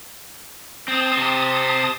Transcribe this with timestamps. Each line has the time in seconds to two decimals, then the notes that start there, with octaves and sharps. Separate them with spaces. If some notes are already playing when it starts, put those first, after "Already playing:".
0.88 C4 A5 D#6
1.13 C3 C4